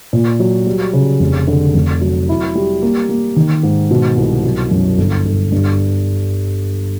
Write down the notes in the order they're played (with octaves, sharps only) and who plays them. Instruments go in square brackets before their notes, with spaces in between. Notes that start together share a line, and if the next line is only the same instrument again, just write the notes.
[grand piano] A#2
F#3
G3
C#3
F1
D3
F1
F#3
E4
G3
A#3
A#3
D#3
G#2
B2
C2
F#3
F#2
G1
G1
G2